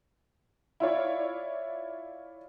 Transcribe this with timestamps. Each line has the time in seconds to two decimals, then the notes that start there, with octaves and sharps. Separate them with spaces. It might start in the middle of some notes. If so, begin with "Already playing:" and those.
0.80 E4 F4 C#5 D5